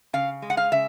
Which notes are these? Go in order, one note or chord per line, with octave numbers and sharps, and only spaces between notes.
C#3 F5
G#3
F#5
F5
C#3 E5